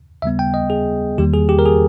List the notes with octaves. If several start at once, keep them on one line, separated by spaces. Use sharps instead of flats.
D#2 C#3 G3 B3 E5
G5
D#5
G#4
E2 D#3 G3 A#3 G4
G#4
G4
A#4
G#4